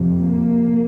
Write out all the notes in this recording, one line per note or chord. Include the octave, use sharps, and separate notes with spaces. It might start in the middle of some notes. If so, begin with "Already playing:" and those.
Already playing: F2 C3
A#3